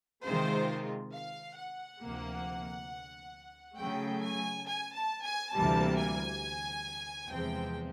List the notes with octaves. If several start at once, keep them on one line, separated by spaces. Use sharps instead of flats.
C3 D#3 G#3 C4 F4 C5
F5
F#5
D2 C3 F3 A#3
C#3 F#3 A3 G5
G#5
G#5
A5
G#5
D2 C3 E3 G3 A#3 A5
G#5
E2 C3 F3 G#3 C4 G5